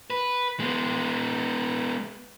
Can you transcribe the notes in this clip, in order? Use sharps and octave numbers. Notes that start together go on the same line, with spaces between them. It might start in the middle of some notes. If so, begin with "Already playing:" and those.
B4
G#3 B3